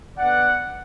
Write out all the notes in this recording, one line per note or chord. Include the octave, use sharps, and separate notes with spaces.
D3 B3 D5 F#5